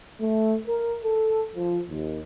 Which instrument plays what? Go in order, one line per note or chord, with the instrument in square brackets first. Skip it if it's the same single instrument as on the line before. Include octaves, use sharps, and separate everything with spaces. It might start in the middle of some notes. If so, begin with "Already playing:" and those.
[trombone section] A3
A#4
A4
F3
D#2